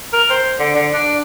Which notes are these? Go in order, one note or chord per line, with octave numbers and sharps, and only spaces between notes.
A#4
C5
D3
D3
D4